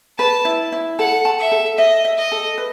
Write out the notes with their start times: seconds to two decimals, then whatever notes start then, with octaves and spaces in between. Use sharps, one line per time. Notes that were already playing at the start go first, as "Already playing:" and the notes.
0.19 B4 A5
0.45 E4
0.72 E4
0.99 A4 F#5
1.25 A5
1.39 E5
1.52 A4
1.78 D#5 E5
2.05 E5
2.18 D#5
2.32 A4
2.58 B4